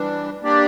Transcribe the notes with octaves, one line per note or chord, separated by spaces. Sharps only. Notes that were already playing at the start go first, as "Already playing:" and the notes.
Already playing: E3 G3 D4
A#3 D4 G4 D5